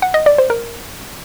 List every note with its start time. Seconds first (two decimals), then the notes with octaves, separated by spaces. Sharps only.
0.02 F#5
0.14 D#5
0.26 D5
0.38 C5
0.50 A#4